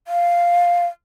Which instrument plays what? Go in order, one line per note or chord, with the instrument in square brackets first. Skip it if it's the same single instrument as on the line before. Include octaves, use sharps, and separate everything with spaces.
[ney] F5